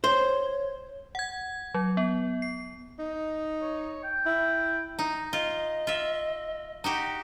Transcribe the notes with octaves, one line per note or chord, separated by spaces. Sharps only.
C5 C#5
F#5 G#6
F#3
B3
C7
D#4
C#5
G5
E4
D#4
F4 D#5
F4 E5
D#4 F#4 G4